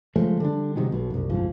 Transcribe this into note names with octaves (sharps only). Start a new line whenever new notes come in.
C#3 F3 G#3 A3
D3 G3 D4
C3 D#3 F#3 G#3
B1 B2
F#1 C2
F#1 B1 G#2 F3